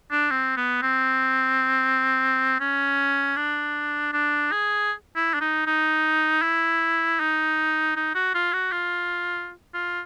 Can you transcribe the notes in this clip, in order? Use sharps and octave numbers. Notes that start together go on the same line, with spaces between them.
D4
C4
B3
C4
C#4
D4
D4
G#4
E4
D4
D#4
D#4
E4
D#4
D#4
F#4
F4
F#4
F4
F4